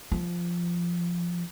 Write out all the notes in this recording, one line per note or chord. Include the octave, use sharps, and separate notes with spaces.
F3